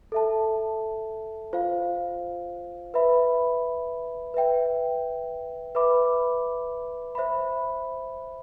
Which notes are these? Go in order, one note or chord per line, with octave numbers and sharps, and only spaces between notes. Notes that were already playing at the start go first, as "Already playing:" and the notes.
A4 E5 A5
F4 C5 F5
B4 E5 B5
B4 E5 G5
B4 E5 B5 D6
C5 E5 B5